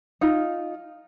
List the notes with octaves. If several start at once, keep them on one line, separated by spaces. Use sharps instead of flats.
D#4 F4